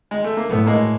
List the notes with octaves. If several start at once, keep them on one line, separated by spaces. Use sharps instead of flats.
G#3
A3
A#3
A2 A3 B3
G#3 A#3